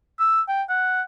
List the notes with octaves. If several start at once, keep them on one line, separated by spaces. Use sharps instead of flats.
E6
G5
F#5